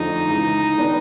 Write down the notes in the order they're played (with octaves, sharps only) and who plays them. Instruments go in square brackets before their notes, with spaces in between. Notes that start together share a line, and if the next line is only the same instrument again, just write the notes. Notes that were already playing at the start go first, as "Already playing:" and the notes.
Already playing: [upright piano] F2 D3 F3 A3 [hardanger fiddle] D#4
[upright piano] C#2 C#3 E3
D3 G3 B3 D4